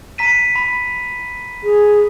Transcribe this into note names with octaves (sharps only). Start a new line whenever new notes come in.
A#5 B6 D#7
B5
G#4